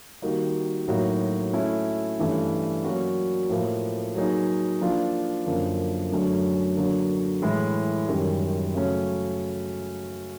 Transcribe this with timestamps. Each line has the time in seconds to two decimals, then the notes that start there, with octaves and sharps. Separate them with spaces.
0.22 D#3 G3 A#3 D#4 F#4
0.88 A2 F#3 A#3 D#4 F#4
1.53 A3 C#4 E4
2.19 G2 E3 A3 C#4
2.84 F#3 A#3 C#4 F#4 A#4
3.50 A2 F3 A#3
4.14 F#3 A#3 D#4 G#4
4.81 F3 A#3 D4 F4
5.46 F#2 D3 F3 A#3
6.12 F#2 D3 F#3 A3 C#4
6.77 D3 F#3 A#3
7.42 A2 E3 G#3
8.08 F#2 D#3 G3
8.75 C#3 F#3 A3 C#4